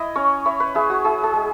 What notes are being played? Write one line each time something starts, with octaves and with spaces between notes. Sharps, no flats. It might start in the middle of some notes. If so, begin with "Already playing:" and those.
Already playing: E4 D#5
C#4 C#5
E4 C#5
B4
E4 G#4
F#4
E4 G#4
G#4
G#3